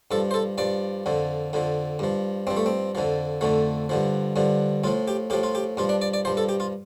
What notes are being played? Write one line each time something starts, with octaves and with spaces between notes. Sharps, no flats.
G2 F3 A4
C5
A4
G2 F3 D5
F2 D3 F3
F2 D3 F3
G2 F3
G2 F3 C4
A3
C4
F2 D3 F3
F2 D3 F3 A3
G2 D3 F3
G2 D3 F3
A2 F3 F4
G4
A2 F3 G4
F4
G4
G2 F3 F4
D4
D5
D5
G2 F3 C5
A4
G4
F4